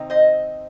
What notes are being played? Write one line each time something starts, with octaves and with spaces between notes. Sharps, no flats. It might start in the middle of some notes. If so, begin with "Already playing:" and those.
Already playing: C3 D#3 C4 D#4
C5 D#5